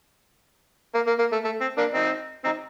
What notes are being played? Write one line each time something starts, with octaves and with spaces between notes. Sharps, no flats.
A#3
A#3
A#3
A3
A3
C4
A#3 D4
C4 D#4
C4 D#4